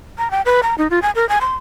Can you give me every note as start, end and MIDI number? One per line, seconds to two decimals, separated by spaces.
0.18 0.28 82
0.31 0.41 79
0.46 0.61 71
0.63 0.75 82
0.78 0.88 63
0.90 0.99 65
1.02 1.11 80
1.15 1.28 70
1.29 1.39 80
1.41 1.55 84